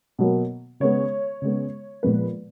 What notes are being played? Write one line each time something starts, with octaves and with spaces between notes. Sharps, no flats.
B2 F#3 A#3
C#3 G#3 B3 C#5
C#3 G#3 B3
A#2 F3 G#3 B3 B4